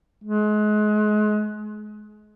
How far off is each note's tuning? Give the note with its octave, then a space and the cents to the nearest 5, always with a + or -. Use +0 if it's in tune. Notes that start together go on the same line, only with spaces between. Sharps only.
G#3 +30